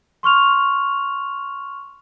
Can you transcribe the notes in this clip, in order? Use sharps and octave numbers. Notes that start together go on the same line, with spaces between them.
C6 C#6 F6 F7